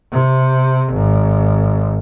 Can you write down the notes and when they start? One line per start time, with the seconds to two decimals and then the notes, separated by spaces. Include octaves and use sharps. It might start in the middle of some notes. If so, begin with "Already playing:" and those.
0.12 C3
0.93 G#1